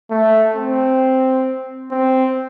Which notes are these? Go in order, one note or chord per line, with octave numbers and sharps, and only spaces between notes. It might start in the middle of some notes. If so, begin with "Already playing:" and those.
A3
C4
C4